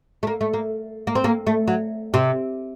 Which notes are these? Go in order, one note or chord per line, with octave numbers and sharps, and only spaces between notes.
A3
A#3
A3
A#3
A#3
C4
A#3
A3
F#3
C3